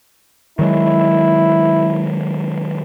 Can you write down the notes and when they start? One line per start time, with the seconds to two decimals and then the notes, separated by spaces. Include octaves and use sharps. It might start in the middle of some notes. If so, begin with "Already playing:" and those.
0.59 D#3 F#3 G#3 E4